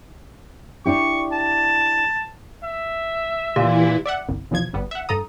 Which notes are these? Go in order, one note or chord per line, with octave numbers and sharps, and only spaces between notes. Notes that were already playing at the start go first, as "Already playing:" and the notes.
D4 E4 G4 C#6
A5
E5
A#2 E3 E4 G4
D5 E5 F#5
G1 C2
B1 E2 B2 F3 G#6
G1 G3 B3
E5 F#5
G2 A4 A#5 D#6